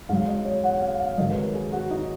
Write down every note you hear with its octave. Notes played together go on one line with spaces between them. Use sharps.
G#2 F#3 F5
D#5
C#5
F#5
F5
F5
G#2 D#3 F#3 D#5
B4
A#4
G#4
F#4
D#4